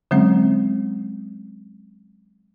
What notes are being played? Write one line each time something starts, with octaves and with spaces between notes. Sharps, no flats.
D3 F#3 G#3 C4 C#4